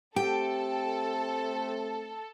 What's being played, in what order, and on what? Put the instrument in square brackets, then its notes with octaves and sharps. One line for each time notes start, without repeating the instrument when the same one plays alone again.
[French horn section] A3 C4 [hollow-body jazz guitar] G4 [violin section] A4 [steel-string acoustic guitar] G5